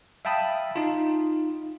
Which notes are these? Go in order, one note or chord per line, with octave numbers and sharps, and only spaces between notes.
E5 F5 G5 A5 B5 D#6
D#4 F4